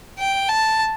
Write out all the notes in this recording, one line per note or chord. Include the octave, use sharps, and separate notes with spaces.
G5
A5